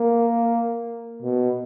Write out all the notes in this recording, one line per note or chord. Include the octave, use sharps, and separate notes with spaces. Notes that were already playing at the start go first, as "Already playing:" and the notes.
Already playing: A#3
B2